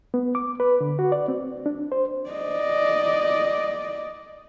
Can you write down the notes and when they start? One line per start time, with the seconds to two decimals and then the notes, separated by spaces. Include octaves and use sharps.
0.14 B3
0.35 D6
0.60 B4
0.81 D3
0.99 F#4
1.12 D5
1.28 C4
1.66 D4
1.92 C5
2.30 D5 D#5